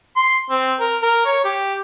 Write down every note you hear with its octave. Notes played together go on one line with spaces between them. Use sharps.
C6
C4
A#4
A#4
C#5
G4